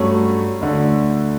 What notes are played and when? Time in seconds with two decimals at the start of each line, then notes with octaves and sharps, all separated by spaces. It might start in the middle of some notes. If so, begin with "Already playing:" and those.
Already playing: G2 F#3 A3 C#4
0.61 D2 D3 A3